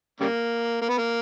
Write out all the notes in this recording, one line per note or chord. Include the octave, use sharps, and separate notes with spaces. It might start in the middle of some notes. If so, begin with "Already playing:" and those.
C#3 G3 A#3
A#3
B3
A#3